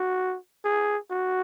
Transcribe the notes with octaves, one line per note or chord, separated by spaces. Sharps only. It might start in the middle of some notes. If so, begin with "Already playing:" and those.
Already playing: F#4
G#4
F#4